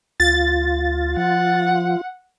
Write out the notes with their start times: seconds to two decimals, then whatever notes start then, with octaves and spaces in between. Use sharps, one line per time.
0.20 D2 F4 A6
1.17 F3 F#5